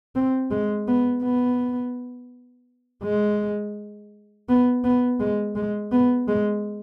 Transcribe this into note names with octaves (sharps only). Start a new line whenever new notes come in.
C4
G#3
B3
B3
G#3
B3
B3
G#3
G#3
B3
G#3